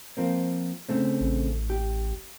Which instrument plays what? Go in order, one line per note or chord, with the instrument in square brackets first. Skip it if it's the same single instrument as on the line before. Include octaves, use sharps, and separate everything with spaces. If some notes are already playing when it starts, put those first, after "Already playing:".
[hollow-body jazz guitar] F3 A#3 C4
C#3 A3 C4
[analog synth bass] A1
[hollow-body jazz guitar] G4